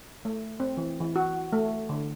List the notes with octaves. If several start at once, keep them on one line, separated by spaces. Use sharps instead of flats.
A3
C4
E3
E3
F#4
A3
D3